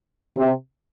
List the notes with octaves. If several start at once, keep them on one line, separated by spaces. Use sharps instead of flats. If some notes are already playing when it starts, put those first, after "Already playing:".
C3